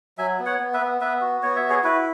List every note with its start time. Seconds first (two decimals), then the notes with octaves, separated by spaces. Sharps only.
0.18 F#3 E5 G#5
0.39 B3
0.46 C#5 F#5
0.60 B3
0.74 B4 E5
0.81 B3
1.01 B3 B4 E5
1.21 F#4
1.43 B3 C#5
1.56 E5
1.63 F#4
1.70 G#4 C#5
1.84 E4 F#4 B4